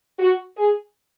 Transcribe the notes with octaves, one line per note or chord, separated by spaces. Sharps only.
F#4
G#4